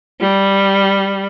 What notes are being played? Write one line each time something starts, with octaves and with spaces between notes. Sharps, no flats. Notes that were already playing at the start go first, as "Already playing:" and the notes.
G3